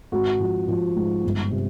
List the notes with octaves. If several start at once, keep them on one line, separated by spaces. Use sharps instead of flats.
G#1 F#4
F3
F3
G#2
G1
C3